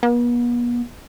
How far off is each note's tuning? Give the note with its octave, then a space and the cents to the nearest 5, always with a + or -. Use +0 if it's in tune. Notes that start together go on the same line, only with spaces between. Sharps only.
B3 -40